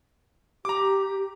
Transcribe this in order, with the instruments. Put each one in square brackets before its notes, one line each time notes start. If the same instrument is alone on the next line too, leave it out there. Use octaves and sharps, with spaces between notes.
[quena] G4 [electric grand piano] A#5 D6